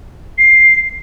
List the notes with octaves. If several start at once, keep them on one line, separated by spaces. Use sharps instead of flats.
C7